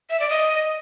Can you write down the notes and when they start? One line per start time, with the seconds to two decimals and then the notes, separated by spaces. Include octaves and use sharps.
0.10 E5
0.20 D5
0.30 D#5